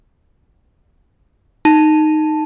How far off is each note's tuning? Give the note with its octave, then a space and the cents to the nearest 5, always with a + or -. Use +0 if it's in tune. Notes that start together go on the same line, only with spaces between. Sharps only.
D#4 -5 A5 +0